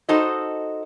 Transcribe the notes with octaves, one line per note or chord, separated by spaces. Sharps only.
D#4 F#4 A4 C5 D#5